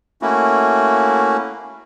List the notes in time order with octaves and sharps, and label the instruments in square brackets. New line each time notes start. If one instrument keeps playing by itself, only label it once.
[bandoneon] A3 A#3 C#4 E4 F#4